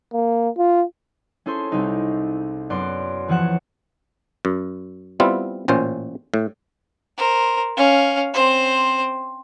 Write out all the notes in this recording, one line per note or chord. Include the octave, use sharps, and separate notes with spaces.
A#3
F4
C#4 E4 G#4 A4 C5 C6
C2 D#4 C#6
F#2 B3 D5 C6 D7
E2 E3 F3 C#5 F#5 E7
F#2
G3 B3 C4 E4 F4
A1 A#2 C#4 C5
A2
A#4 C5
C#4 F5
C4 C5